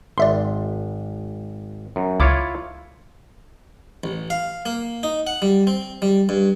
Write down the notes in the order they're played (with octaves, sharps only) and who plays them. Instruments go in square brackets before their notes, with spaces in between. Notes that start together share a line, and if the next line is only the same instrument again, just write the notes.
[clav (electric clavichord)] G#1 [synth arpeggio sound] D5 E5 C6
[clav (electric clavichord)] F#2
[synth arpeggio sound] C#2 D6 [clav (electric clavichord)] E4 F4 C#5
[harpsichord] A1
F5
A#3
D#4
F#5
G3
C4
G3
G2